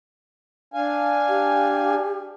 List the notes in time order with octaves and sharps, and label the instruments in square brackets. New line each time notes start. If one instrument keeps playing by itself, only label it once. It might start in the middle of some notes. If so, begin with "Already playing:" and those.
[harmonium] D4 F5 G#5
[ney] G4